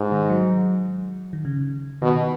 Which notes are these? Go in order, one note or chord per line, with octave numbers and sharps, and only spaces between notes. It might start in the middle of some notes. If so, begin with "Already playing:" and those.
Already playing: G#2
D#3
F#3
D#3
C#3
B2 D#3